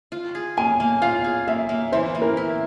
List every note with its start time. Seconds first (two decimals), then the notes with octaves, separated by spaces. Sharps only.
0.12 F4
0.35 G#4
0.57 A#3 G#5
0.80 A#3
1.02 F4 F5
1.24 G#4
1.47 A#3 E5
1.69 A#3
1.92 E3 C5
2.15 A#3
2.22 A#4
2.37 E4